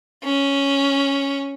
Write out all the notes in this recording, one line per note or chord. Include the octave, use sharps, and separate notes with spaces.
C#4